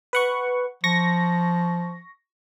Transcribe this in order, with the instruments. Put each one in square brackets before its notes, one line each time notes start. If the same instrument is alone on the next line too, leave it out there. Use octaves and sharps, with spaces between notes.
[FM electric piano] B4 F#5 C#6
[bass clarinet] F3 [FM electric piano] C#6 A#6